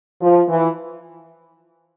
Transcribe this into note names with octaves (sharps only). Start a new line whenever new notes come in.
F3
E3